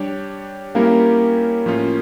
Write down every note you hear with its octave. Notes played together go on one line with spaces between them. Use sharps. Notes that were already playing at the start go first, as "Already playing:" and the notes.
Already playing: G3 D4 G4 C#5
G3 A#3 C#4 E4 G4 A#4
A2 F3 C#4 F4